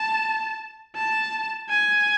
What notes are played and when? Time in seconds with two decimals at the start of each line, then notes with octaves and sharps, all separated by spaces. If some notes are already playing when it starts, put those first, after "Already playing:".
Already playing: A5
0.96 A5
1.70 G#5